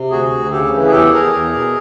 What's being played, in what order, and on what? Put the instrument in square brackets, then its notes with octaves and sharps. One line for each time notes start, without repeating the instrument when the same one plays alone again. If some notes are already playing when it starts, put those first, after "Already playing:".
Already playing: [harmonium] C3
D2 F#4 G#4
D2
C#3 G4 A4
E3
G#4
E2 G4 A4
E2 G#4 A#4
E2
B2